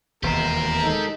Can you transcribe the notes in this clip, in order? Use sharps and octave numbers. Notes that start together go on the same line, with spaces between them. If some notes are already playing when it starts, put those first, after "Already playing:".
E1 D#2 B2 G4 A#4 C5
G#3 D#4 A4